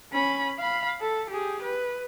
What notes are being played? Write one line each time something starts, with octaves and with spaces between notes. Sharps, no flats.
C#4 B5
F5 B5
A4
G4 G#4
B4